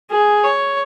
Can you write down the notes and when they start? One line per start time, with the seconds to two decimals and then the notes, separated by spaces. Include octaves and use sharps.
0.10 G#4
0.44 C#5